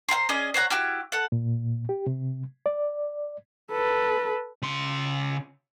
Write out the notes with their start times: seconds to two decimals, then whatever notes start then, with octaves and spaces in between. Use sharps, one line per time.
0.09 C5 F5 A#5 C6
0.29 C#4 G#4 D5 D#5
0.54 C5 C#5 F#5 A#5
0.70 E4 F#4 G4 F6
1.12 A4 F#5
1.32 A#2
1.89 G4
2.07 C3
2.66 D5
3.72 A4 B4
4.62 C#3 C6